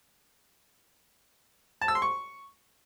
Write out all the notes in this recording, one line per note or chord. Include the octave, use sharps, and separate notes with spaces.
A5
E6
C6
C#6